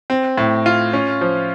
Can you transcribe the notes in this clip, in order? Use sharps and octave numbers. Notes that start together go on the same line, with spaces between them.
C4
A2
F4
C#4
F3